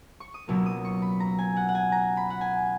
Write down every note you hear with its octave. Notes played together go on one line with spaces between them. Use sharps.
C#6
D#6
C#2 B2 F#3 A#3 E6
D#6
C#6
B5
A#5
G#5
F#5
F#5
G#5
A#5
B5
F#5
G#5